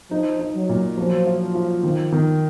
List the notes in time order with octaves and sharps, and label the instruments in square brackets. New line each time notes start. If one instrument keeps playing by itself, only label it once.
[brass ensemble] F3 [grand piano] D#4
[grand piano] D#4
[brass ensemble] F#3
[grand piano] A#2
[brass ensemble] F3 [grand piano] F#3
[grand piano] F4
F4
D#3
D#3